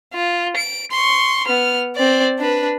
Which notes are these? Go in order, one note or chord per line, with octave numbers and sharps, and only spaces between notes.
F4
D7
C6 C#6
B3 F6
C4 D5
D4 B4